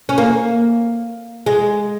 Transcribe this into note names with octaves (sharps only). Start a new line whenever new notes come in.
C#4
A#3
G#3